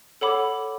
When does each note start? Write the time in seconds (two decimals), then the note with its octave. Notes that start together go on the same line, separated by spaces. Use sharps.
0.21 A4 C#5 F#5 B5 D6